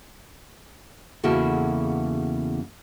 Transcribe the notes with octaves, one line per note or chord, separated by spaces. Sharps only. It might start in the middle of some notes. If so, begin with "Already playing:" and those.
E2 C#3 A#3 E4 F#4 A4